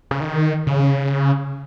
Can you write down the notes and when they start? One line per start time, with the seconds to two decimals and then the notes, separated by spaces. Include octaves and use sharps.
0.11 C#3
0.21 D#3
0.67 C#3